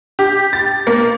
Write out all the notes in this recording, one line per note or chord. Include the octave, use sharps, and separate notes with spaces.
G4
A6
A#3